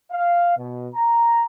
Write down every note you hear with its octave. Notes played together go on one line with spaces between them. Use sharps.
F5
B2
A#5